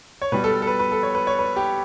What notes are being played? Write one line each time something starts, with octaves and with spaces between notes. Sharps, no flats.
C#5
B2 G3 B4
A4
A4
B4
B4
A4
C#5
B4
C#5
B4
G4